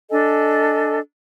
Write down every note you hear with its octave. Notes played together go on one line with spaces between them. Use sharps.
D4 A4 D#5 G#5